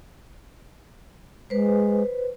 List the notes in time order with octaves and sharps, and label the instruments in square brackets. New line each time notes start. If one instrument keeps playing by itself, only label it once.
[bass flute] G#3 [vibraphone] B4 C5